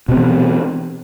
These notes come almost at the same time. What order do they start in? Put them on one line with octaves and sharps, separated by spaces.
B2 C4 B3 E3